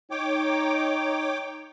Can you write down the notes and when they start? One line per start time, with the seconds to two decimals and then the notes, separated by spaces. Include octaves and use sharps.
0.11 D#4 C#5 G5 D6